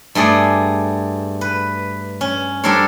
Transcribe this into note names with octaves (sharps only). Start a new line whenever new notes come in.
G2 A3 G#4 D5
B4
C#4
G3 D4 A4 A#4 C5 C#5